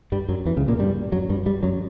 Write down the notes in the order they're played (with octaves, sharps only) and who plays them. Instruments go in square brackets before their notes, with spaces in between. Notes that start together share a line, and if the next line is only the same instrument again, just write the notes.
[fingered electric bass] G2 G3
F#2 F#3
E2 E3
C#2 C#3
A#2 A#3
G2 G3
F#2 F#3
G2 G3
G2 G3
F#2 F#3